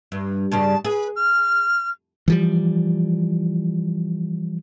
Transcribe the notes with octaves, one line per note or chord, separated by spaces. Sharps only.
G2
G2 C#3 G3 A5
G#4 B4
F6
E3 F3 G3